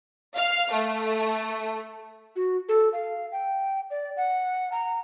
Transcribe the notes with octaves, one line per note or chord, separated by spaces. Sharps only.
F5
A3
F#4
A4
F5
G5
D5
F#5
A#5